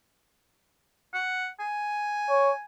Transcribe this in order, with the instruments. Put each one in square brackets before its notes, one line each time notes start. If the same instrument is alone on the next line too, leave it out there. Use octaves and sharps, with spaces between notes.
[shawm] F#5
G#5
[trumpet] C#5